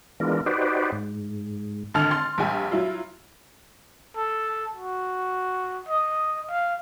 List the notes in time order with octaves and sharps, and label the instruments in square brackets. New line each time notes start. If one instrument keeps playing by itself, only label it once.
[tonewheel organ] E3 G#3 B3 D4 F4 A#4
D#4 F#4 G4 B4 C5 D5
G#2
[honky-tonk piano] G#1 D3 A5 F6
C6 A6
A#1 G3 G4 G#5
F#3 E4 F4
[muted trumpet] A4
F#4
D#5
F5